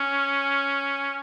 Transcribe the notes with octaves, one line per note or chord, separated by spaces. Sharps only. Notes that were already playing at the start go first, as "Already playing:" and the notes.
Already playing: C#4